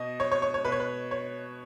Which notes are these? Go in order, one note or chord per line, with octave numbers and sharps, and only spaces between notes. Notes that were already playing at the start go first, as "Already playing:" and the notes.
Already playing: B2 D#5
C#5
C#5
C#5
C#5
B2 B4
C#5
B4
C#5